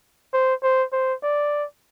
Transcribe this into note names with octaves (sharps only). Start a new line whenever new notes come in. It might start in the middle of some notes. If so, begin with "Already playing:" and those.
C5
C5
C5
D5